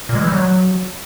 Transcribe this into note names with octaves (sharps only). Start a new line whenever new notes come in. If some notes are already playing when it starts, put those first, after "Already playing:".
A#2
G#3
E3
G3
F#3